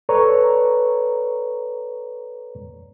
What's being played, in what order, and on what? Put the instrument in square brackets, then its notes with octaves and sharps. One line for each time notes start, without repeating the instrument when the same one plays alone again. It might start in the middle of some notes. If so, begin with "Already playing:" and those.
[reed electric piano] A4 B4 C#5 D5 A#5 C#6